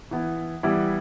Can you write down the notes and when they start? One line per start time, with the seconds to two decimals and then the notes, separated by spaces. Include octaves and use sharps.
0.11 E3 B3 E4
0.63 E3 G3 B3 E4